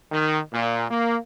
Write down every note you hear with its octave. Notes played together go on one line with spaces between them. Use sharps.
D#3
A#2
A#3